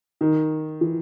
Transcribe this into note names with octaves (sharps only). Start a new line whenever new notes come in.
D#3
E3